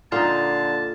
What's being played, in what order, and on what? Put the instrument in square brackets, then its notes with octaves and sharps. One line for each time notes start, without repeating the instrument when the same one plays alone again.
[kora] A#2 D#4 [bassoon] D3 [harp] F4 [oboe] A5